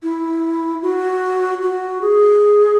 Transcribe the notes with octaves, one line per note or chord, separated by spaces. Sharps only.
E4
F#4
F#4
G#4